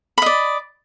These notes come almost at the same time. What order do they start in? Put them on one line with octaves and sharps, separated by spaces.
B5 D#5 D5